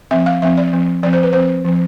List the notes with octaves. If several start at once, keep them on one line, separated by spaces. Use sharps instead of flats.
F3 C4 E5
F5
F3 C4 E5
D5
F3 C4
F3 C4 D5
C5
B4
F3 C4 C5
F3 C4